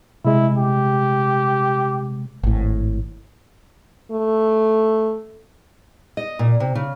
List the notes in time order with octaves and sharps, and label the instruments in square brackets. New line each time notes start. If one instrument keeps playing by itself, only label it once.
[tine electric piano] C3 G#3 [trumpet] E4
[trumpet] G4
[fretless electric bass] G#1 A2
[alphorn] A3
[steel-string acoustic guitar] D#5
A#2
C3
C#3